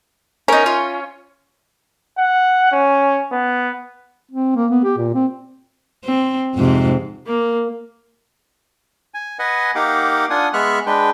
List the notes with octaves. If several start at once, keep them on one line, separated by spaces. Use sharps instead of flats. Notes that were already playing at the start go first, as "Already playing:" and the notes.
C#4 D#4 A#4
F4
F#5
C#4
B3
C4
A#3
B3
G4
A#2
C4
C4
F2 G#2 C3
A#3
G#5
B4 D#5 F#5 G#5
A#3 D#4 G4 F5 F#5 D6
D4 F4 F#5 G#5 D#6
G#3 B3 E5 C#6 F6 F#6
G#3 D4 B4 G5